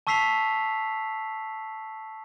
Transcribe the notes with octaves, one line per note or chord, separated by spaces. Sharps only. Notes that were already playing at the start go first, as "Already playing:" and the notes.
A5 C#6 E6 B6 C7 F7